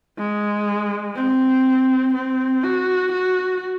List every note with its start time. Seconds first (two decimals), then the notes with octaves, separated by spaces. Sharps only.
0.18 G#3
1.16 C4
2.14 C4
2.64 F#4
3.12 F#4